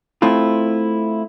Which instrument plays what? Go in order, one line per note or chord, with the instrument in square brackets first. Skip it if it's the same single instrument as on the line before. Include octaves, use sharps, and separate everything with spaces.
[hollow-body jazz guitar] A3 C4 E4 F4